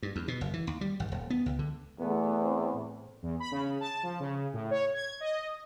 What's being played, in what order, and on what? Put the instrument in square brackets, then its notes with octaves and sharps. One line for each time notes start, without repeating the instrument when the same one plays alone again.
[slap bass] G2
E2
B2
F#1
E3
D#2
G3
G#1
D#1
B3
C#2
D3
[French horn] E2 [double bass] A3 B3
[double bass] C4
A2
[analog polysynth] E2
B5
C#3
A5
F3
C#3
A2
C#5
G#6
D#5